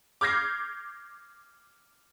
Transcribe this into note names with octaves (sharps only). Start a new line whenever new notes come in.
D6 F6 G6 G#6 A#6 C7